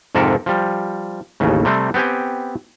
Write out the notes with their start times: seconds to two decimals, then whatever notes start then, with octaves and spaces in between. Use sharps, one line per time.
0.15 F2 G#2 C3 A4 A#4 E5
0.46 F3 G3
1.40 A1 D#2 C#3
1.65 C3 G3 A3 C4
1.94 B3 C4 G4 G5 G#5